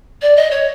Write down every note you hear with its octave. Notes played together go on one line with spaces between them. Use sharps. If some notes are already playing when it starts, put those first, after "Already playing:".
D5
D#5
C#5